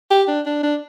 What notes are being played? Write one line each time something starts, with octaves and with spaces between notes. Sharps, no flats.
G4
D4
D4
D4